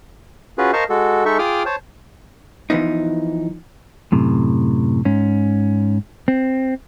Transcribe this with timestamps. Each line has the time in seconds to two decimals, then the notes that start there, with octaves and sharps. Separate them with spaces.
0.58 C#4 F4 F#4 G#4 B4
0.73 A#4 C5 D#5 F5 A5 C#6
0.89 G#3 F#4 A4
1.25 G#3 D#4 A4 E5 C#6
1.39 F4 G#4 G5 D6 D#6 F6
1.66 C5 C#5 A5
2.70 E3 F3 B3 D#4
4.12 F#2 A2 C3
5.05 G#2 C#4
6.28 C4